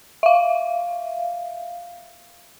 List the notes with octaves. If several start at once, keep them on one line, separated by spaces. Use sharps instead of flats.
E5 F5